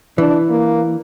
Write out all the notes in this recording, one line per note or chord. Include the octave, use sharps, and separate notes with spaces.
E3 D4
A#3